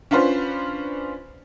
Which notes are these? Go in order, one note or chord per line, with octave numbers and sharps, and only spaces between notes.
C#4 D4 F4 B4 C5